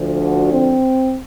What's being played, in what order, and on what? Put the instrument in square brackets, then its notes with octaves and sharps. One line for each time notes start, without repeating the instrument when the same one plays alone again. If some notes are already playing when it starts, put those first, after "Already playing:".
Already playing: [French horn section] D2 D3 F3
F#4
C4